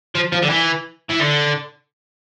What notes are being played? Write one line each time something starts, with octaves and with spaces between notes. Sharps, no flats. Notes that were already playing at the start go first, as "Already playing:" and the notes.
F3
F3
D3
E3
E3
D3